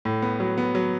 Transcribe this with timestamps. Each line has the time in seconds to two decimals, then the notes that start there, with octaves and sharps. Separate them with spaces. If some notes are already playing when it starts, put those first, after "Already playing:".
0.05 A2
0.22 B3
0.40 F#3
0.58 B3
0.75 F#3